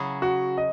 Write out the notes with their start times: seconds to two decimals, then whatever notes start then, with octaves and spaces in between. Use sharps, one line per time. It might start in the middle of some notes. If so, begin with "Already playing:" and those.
Already playing: C#3 F#3 C#4 E4 G#4
0.22 F#4
0.58 D#5